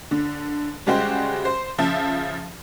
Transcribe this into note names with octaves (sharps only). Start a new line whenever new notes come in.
D3
C#3 G3 G#3 F#4 G4 C5
C5
C#3 F3 E5 A5